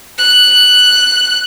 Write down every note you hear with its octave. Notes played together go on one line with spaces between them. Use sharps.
F#6